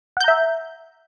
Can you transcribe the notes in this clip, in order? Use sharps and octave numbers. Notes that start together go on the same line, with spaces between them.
E5 F#5 A#5 G6